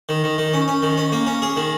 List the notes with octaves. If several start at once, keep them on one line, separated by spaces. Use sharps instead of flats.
D#3
D#3
D#3
C#4
C#4
D#3
C#4
A#3
C#4
G#4
D#3